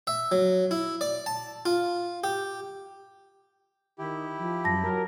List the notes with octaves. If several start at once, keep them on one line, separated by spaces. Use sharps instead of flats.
E5
F#3
E4
D5
A5
F4
G4
D#3 E4 G4
F3
F#2 A5 A#6
F#3 A#4